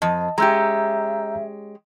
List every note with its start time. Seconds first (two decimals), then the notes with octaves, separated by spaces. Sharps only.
0.02 F2 D#5 A5
0.38 G#3 C#4 G4 E5 A#5 E6 G6